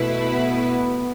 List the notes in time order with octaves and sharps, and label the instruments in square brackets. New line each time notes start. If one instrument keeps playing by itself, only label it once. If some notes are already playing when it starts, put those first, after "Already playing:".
Already playing: [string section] B2 A3 E4 B4
[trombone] B3